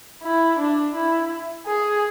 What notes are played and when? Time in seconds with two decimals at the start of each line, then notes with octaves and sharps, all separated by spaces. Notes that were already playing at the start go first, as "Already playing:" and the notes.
0.23 E4
0.58 D4
0.95 E4
1.66 G#4